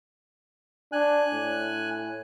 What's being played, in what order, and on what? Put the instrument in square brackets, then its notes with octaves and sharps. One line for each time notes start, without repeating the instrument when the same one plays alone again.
[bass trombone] D4 [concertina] G#5 F#6
[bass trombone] A2